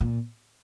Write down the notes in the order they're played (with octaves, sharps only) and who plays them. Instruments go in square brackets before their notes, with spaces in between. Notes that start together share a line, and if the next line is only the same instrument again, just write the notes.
[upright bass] A#2